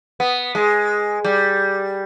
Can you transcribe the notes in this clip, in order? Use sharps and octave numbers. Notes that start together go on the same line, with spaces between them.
B3
G#3
G3